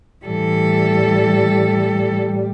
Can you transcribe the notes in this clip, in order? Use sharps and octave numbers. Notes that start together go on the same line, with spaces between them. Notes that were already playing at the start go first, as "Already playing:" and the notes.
A2 E3 G3 A4